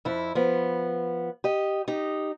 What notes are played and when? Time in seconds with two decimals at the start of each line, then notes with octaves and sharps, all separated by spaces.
0.05 F2 E4
0.35 F3 B3
1.44 G4 D#5
1.88 D#4 G4